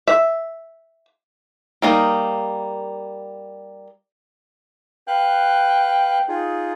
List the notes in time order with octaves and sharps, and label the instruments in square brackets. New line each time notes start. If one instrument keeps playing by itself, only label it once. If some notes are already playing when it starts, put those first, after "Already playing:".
[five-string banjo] E5
G3 A#3 D#4 A#4
[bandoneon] B4 F5 F#6 [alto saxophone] G5
[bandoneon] D#4 F4 G#4